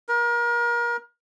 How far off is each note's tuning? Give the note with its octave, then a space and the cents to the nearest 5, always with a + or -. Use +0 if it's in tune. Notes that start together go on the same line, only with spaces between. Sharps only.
A#4 +30